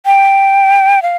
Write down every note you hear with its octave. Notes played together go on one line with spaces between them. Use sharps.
G5
F5